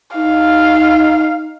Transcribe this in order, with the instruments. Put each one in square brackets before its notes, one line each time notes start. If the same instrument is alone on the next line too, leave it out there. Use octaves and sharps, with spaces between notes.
[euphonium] D#4 [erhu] F5